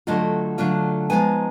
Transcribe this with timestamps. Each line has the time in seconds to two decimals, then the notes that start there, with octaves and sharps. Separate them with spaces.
0.07 D3 F#3 A3 D4 F4 D#5
0.58 D3 F#3 A3 D4 F4
1.10 F3 G#3 B3 D#4 G#5